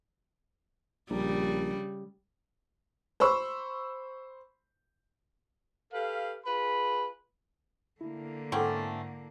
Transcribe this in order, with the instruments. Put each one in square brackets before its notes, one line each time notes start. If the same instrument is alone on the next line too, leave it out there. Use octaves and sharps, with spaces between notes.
[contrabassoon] A#1 [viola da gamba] C#3 G3
[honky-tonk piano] C5 B5 C#6 E6
[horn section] G4 A4 B4 F5
F4 G#4 B4 B5
[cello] D3 A#3 [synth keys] E4
[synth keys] G#2 A4 [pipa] A3 C4 C#4 [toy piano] E4 F#5 D6